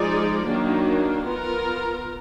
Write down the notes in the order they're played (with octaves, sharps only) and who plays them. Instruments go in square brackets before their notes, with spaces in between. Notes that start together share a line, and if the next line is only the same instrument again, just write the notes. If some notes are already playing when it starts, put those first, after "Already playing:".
Already playing: [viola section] F3 G#3 D#4 G#4 D5
D#3 F#3 A#3 D4
B3 F4 A#4